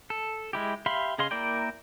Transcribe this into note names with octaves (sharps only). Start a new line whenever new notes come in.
A4
G#3 E4 G4
G4 E5 F5 B5 C6
C#3 G#4 D#5 F5 C6
A#3 E4 A#4 D5 G5